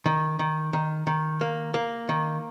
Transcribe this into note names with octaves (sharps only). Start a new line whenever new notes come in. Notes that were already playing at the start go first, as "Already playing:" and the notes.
D#3
D#3
D#3
D#3
A#3
A#3
D#3